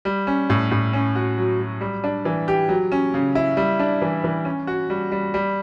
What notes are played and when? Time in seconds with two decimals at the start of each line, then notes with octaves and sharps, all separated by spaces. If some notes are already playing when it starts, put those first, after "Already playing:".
0.05 G3
0.27 C#4
0.50 A2
0.71 A2
0.93 C#4
1.15 F#4
1.38 F#3
1.60 F#3
1.81 G3
2.04 D4
2.25 E3
2.48 G4
2.69 F#3
2.92 C#4
3.14 C#3
3.35 E4
3.57 G3
3.80 D4
4.02 E3
4.24 E3
4.45 C#4
4.67 F#4
4.90 G3
5.12 G3
5.34 G3